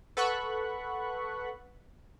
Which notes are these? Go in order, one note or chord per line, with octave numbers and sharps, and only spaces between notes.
A4 B4 F#5 B5 C#6 F#6